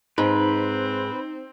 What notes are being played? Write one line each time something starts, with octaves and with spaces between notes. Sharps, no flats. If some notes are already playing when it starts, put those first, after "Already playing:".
G#2 C4 D#4 B4